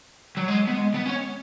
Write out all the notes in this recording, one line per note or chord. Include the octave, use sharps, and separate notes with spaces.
F#3
G#3
B3
G#3
B3
C#4